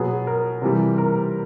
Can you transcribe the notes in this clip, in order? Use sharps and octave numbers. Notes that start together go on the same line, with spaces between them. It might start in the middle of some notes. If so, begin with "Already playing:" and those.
Already playing: B2 F#3 B3 G#4
A#4
C3 E3 G3
A#4